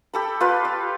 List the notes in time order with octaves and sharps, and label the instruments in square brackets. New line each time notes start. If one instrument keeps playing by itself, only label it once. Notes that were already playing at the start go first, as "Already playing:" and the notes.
[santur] G4 A4 B5
F4 B4 D5
D5